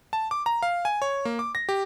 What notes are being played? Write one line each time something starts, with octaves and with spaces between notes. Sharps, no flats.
A5
D6
A#5
F5
G#5
C#5
A#3
D6
A#6
G4